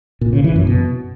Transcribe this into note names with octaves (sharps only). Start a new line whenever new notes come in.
A#2
C#3
E3
F#2
B2